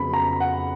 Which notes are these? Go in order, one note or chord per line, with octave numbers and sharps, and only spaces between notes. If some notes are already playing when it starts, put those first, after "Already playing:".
Already playing: F2 C#3 F#3 B3 B5
A#5
F#5